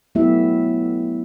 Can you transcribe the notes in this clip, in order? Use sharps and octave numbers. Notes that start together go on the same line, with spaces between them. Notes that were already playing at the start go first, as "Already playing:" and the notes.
F#3 A3 B3 E4 G4 E5